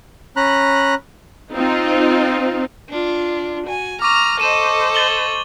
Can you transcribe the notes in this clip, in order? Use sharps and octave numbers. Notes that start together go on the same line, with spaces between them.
C#4 A#5 B5 F#6
C4 D#4 F4
D4 F4
F#4 G#5
A#5 C#6 D6 F6
A4 C5 D#5 D#7 E7
A6 F#7 G7